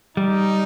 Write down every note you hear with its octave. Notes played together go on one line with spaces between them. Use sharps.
G3 D#4